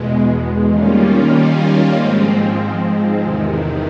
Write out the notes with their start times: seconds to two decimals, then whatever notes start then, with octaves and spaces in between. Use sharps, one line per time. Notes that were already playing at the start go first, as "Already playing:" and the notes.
Already playing: E2 B2 G#3
0.68 D#3 G3 A#3 C#4 F4
1.94 G#2 F3 G#3 C4
3.20 E2 C3 D#3